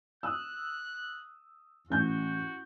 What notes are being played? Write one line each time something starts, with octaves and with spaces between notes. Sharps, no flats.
D#6 E6 F#6
A1 F#4 G6